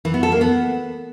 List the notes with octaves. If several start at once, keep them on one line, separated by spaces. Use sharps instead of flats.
E3
B3
A4
A#3
B3